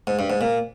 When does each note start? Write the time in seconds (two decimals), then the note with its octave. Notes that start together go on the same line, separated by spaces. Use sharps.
0.07 G#2
0.19 G2
0.30 G#2
0.41 A#2